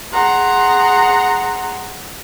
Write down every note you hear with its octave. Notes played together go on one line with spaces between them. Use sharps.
G#4 F#5 A#5 C6